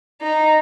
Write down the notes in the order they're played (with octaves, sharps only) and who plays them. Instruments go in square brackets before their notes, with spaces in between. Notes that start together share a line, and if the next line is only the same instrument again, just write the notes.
[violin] D#4